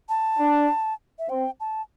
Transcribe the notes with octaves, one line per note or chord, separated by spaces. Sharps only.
A5
D4
E5
C4 G5
A5